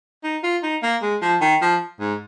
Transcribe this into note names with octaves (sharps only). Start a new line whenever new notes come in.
D#4
F4
D#4
A#3
G#3
F3
D#3
F3
G#2